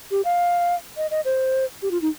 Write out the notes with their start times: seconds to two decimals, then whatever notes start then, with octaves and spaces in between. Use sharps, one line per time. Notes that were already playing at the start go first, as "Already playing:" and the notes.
0.11 G4
0.25 F5
0.97 D#5
1.11 D#5
1.25 C5
1.82 G4
1.91 F4
2.02 D#4